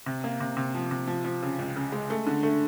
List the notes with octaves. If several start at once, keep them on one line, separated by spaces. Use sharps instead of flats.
C3
A#3
C3
C3
F3
C3
F3
F3
C#3
C#2
C#3
G#3
A3
D3
A3